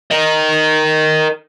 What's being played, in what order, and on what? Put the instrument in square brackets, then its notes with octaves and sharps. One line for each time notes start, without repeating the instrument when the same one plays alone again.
[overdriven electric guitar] A#4 D#5